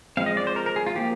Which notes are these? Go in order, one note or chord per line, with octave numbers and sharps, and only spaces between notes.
F3 G#3 C4 F5
D#5
D5
C5
A#4
A#4
G#4
F4
F3 A#3 G4